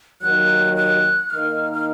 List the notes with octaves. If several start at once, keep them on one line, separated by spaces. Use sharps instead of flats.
D#2 D#3 F#3 F#6
F#6
D#3 A#3 D#4 F6
F6